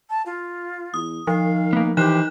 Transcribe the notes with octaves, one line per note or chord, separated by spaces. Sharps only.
A5
F4
E2 D#6
D#3 F3 F5
A#3 B3
D#3 E3 D#4 G4 C5 F#6 E7